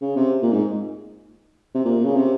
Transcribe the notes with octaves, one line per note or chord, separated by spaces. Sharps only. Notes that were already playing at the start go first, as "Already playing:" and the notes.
C#3
C3
A#2
G#2
C3
A#2
C#3
C3